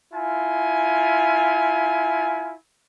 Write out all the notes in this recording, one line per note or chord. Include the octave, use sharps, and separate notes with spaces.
E4 F4 G#5